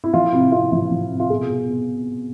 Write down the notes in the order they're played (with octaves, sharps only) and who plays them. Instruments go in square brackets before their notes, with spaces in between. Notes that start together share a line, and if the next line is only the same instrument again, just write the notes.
[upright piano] E4
F3 F4
C3 E4
C3 F4
F3 F4
F3
C3
F4
B2 G#4
B2
B2